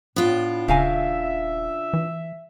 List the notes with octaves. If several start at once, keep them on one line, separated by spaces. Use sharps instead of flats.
A2 B3 D4 F4
D#1 C#3 E5 F5 G#5
E3